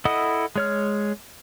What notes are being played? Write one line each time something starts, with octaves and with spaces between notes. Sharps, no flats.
E4 A4 D#5 F#5 D#6
G#3 C#5 F6